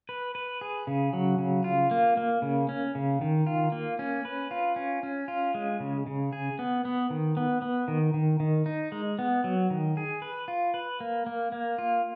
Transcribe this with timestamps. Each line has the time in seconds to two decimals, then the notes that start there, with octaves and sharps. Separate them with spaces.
0.09 B4
0.35 B4
0.61 G#4
0.87 C#3
1.13 F#3
1.39 C#3
1.64 F4
1.91 A#3
2.17 A#3
2.42 C#3
2.69 C#4
2.95 C#3
3.21 D#3
3.47 F4
3.72 A#3
3.99 C#4
4.25 B4
4.51 F4
4.76 C#4
5.03 C#4
5.28 F4
5.54 G#3
5.80 C#3
6.07 C#3
6.33 G#4
6.59 B3
6.85 B3
7.10 D#3
7.37 B3
7.62 B3
7.88 D#3
8.14 D#3
8.40 D#3
8.66 D#4
8.92 G#3
9.19 B3
9.44 F#3
9.70 D#3
9.97 G#4
10.22 B4
10.48 F4
10.74 B4
11.00 A#3
11.26 A#3
11.52 A#3
11.78 F4